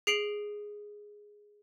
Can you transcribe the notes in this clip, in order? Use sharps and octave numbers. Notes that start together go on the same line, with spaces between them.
G#4 C7 D7 F#7